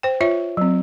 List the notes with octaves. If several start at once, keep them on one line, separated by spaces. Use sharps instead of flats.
C5 G5
F4 C#5 E5
F#3 C4